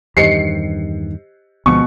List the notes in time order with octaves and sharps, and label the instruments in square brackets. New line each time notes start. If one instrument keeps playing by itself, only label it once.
[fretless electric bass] E2 G2 D#3 [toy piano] G4 C5 D#5 [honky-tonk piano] C7 C#7
[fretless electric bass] D2 F3 G#3 [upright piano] B2 [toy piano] G#5 [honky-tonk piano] C#6